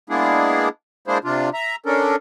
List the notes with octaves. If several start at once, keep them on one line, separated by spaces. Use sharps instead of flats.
G#3 A#3 B3 D4 E4 G#4
G#3 A#3 D4 E4 G#4 C5
C3 D4 F4
E5 A#5
C#4 D4 A4 A#4